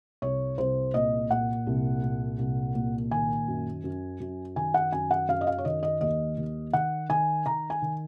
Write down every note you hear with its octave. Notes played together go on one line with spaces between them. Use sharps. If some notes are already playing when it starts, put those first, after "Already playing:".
C2 C#5
C2 C5
A#2 D#5
A#2 F#5
C2
A#2
C2
A#2
D#3 G#5
F#2
F#2
F#2
D#3 G#5
F#5
F#2 G#5
F#5
F#2 F5
D#5
F5
C#5
D#3 D#5
D#5
D#2 D#5
D#2
D#3 F#5
D#3 G#5
D#3 A#5
G#5
D#3